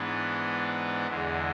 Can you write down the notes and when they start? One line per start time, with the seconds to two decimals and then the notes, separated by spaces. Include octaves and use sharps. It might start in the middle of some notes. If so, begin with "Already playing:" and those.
Already playing: G#2 E3 B3 D4
1.07 E2 D3 G#3